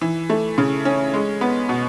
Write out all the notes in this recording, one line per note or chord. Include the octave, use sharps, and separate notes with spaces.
E3
A3
C#3
C#4
G#3
B3
B2